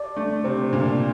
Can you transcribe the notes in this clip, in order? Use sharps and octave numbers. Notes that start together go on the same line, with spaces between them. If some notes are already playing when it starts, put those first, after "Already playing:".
Already playing: D5
A3 D4
C3 C5
A#2 D4